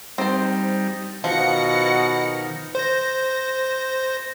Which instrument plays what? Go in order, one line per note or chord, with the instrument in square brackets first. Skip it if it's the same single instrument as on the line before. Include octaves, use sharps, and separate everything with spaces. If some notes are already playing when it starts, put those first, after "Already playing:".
[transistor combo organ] G3 D#4 [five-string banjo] C4 C5
[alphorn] B2 [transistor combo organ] D#3 [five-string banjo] F3 [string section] F#5 A#6 C#7
[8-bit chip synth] C5 A#6